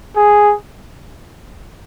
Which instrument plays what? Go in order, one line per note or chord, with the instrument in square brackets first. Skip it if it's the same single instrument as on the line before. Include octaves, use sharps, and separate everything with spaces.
[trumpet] G#4